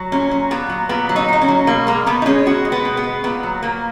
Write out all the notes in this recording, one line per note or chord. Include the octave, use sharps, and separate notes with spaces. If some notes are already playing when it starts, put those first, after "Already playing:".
Already playing: F#3
A#2 C#4
F#3
A#2 B3
F#3
A#2 B3
F#3
D#4
A#2 D#4
C#4
F#3
B2 A#3
G#3 A#3
B2 B3
D#4
G#3 C#4
B2 F#4
G#3
B3
B2
B3
G#3
A#2 B3
F#3
A#2 A#3